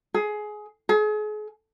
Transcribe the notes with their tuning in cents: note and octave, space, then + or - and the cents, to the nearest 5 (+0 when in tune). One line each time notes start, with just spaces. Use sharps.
G#4 +20
G#4 +40